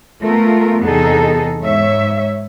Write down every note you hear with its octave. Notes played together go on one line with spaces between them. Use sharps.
A3 B3 F4 A#4
E2 C3 B3 D#4 G#4 A4
G#2 C#5 E5